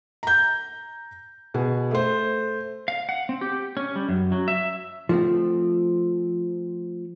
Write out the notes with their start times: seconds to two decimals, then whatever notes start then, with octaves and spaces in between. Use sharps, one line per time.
0.23 A#5 G6
1.54 B2 G#4
1.91 A3 C5
2.88 F5
3.09 F#5
3.29 C4
3.41 G4
3.77 C#4
3.96 G3
4.09 F#2
4.32 F#3
4.48 E5
5.09 F3 A3 C4